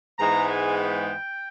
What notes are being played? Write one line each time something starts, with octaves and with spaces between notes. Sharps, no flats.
G#2 E3 G#3 B3 A#5
G#5
G5